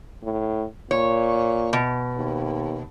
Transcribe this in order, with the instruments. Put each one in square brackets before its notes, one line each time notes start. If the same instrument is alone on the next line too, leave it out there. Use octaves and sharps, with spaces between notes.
[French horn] A2
[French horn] A#2 [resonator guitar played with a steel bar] C#5
[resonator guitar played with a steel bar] B2
[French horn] D#2